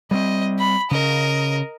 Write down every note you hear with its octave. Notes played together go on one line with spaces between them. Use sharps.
G3 G#3 C4 D#5
B5
C#3 A#4 D#5